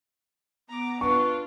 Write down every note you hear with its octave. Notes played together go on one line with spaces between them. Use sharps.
B3 A#5 D6
D4 F4 B4 C#6